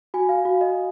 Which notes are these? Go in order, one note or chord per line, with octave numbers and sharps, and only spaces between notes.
F#4 G#5
F5
F#4
D#5